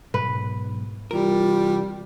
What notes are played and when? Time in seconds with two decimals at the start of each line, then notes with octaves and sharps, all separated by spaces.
0.14 B1 G#2 B4
1.11 C3 E3 G3 F4 A#4